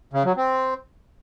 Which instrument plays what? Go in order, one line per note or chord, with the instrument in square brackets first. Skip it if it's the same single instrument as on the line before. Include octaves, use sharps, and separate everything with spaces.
[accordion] C#3
F#3
C4